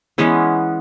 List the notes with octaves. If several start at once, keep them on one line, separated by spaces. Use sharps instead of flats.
E3 G#3 B3 C#4